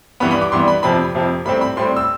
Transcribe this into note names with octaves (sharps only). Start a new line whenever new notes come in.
G2 E3 G3 B3 B5
B5
D6
G2 E3 G3 B3 C6
B5
F2 C3 F3 B5
F2 C3 F3
A2 G3 C4 B5
B5
A2 G3 C4 C6
E6